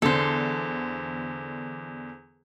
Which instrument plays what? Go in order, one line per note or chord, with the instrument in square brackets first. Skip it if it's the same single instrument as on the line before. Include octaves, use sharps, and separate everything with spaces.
[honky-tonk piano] E2 D3 [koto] A4 C5